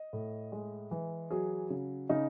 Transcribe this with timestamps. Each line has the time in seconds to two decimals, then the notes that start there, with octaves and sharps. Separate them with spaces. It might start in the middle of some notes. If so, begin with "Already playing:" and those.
Already playing: D#5
0.13 A2
0.52 G#3
0.91 E3
1.30 F#3 G#4
1.70 C#3
2.09 C#3 D#4